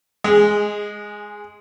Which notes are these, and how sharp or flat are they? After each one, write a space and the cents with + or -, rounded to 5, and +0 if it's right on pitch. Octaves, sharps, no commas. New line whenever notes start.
G#3 +0 G#4 -20